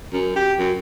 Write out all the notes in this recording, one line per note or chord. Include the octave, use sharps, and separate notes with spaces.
F#2
G4
F#2